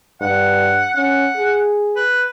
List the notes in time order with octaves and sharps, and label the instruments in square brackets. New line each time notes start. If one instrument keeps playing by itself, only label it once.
[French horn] G2 [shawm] F#5
[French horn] C#4 [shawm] F#5
[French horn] G#4
[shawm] B4